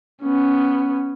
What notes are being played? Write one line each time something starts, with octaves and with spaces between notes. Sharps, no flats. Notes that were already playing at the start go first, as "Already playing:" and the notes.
B3 C#4